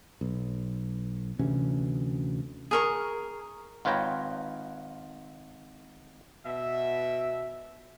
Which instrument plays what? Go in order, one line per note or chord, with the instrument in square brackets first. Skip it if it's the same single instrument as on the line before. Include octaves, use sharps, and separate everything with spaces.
[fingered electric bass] B1
D2 C3 E3 C#4
[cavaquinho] G#4 A#4 C#6
[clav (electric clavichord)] G#1 F4 B4 C#5 G5 A#5
[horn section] B2 E5